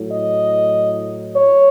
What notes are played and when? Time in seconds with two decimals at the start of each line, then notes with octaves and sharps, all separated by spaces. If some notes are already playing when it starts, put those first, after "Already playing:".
Already playing: A2 F#3
0.09 D#5
1.33 C#5